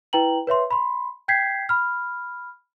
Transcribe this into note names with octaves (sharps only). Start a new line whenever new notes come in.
E4 B4 G5 A#5 F#7
B4 C#5 E5 C6
B5 C6
G5 G6 G#6 B6 C7
B5 F6